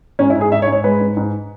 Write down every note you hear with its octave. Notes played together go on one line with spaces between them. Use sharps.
G#2 C#4
E4
G#2
G#4
G#2 E5
C#5
G#2
C#5
G#3 B4
G#2
G#2